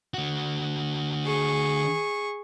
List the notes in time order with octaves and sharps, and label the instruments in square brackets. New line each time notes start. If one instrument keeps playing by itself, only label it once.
[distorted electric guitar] D3 F#4
[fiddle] G#4 C#6